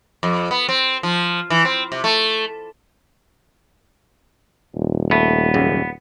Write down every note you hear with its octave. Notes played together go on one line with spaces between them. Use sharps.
F2
B3
C4
F3
E3
C4
C3
A3
D#1
A3 B3
G#1 F#2 C#3